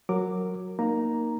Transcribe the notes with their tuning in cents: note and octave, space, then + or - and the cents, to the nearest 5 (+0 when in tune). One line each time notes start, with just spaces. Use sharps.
F#3 -5 A#4 -15 D6 +0
A#3 +10 D#4 -10 A#5 +0